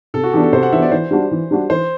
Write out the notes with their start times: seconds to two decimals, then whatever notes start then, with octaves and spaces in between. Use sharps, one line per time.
0.14 C3 A4
0.24 F#4
0.33 E3 B3 D4 G4
0.43 A4
0.52 C3 C5
0.63 F#5
0.72 E3 B3 D4 E5
0.82 D5
0.92 E3 C5
1.11 G3 D4 F#4
1.31 E3
1.51 G3 D4 F#4
1.70 E3 C5